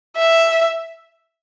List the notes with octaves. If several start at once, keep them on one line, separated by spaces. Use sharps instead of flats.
E5